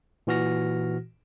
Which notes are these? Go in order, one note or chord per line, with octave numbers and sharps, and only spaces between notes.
A#2 E3 F#4 F6 A#6